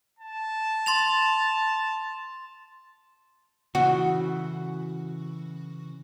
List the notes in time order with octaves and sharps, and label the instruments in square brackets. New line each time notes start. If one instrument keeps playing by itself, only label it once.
[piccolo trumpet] A5
[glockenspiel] C6 A6 F7
[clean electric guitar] C#3 E3 [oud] F#4